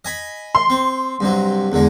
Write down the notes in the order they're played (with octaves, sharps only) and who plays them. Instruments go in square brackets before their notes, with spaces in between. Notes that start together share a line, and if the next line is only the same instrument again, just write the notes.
[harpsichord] D#5 G#5 B5
[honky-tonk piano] C6
[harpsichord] C4
G2 C3 F#3
E2 D3 G#3